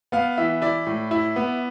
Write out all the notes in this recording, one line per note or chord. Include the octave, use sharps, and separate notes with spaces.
B3 F5
E3 E5
E4 D5
A2
E4
B3